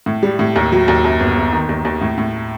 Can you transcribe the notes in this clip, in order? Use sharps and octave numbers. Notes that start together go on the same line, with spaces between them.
A2
G3
A2
D#2
F#3
D#2
F#2
G1
G1
D#3
D#2
D#2
A2
A2